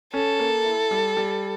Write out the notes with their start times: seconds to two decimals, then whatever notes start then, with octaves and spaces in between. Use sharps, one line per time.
0.14 C#4 A4
0.40 A#3
0.65 E4
0.91 G3
1.17 G3